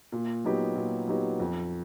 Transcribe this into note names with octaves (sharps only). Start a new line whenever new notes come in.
A#2
F#3 B3 D#4 G4
A#2
F#3 B3 D#4 G4
F2